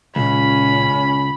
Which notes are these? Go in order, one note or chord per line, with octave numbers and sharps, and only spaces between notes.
C#2 A#2 C#4 B5